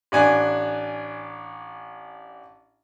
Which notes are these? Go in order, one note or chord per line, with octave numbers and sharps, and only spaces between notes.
A1 D4 G#5 F#6